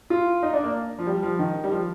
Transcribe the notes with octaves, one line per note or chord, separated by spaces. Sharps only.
F4
D#4
D4
A#3
F3
G3
F3
D#3
G3
F3